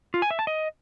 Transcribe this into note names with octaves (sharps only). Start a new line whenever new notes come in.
F4
G#5
E5
A5
D#5